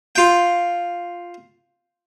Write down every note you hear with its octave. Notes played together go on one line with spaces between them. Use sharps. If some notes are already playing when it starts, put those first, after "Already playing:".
F4 G5